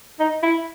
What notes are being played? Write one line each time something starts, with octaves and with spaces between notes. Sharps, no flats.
D#4
E4